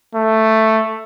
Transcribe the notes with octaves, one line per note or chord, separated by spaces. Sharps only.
A3